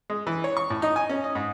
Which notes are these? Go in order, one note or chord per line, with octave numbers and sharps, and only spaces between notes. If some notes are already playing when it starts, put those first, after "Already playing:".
G#3
E3
C#5
C#6
A2
D#4
G#5
C#4
D#5
G#2